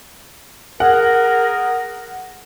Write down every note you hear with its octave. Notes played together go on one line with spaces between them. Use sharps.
G#4 A#4 F#5